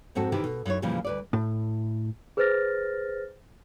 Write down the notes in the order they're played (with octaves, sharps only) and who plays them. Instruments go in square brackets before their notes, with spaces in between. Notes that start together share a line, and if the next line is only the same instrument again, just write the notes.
[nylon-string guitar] F2 G#2 C4 F#4 A4
C3 D#3 E3 G4 A4 C5
B2
F#2 D#4 E4 C#5
F2 A#2 C#3 E3 F3 G3
D2 B4 D5
[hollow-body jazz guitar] A2
[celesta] G#4 B4 C5 F6 A6 A#6